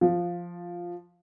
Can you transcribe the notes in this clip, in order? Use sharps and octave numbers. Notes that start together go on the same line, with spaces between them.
F3